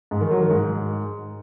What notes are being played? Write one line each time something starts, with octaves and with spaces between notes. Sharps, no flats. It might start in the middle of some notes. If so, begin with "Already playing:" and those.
G#2
D#3
F#3
D#3
G#2